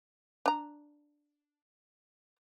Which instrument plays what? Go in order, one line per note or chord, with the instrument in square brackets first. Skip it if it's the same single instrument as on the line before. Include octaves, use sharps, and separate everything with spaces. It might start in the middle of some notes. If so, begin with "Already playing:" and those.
[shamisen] D4 A#5